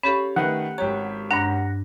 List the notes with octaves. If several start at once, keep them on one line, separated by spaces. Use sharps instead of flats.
C#4 G4 A4 C#5 F5 B5
D#3 A3 B4 F#5
G#1 G4 C#5 A#5
G2 D4 F#5 A#5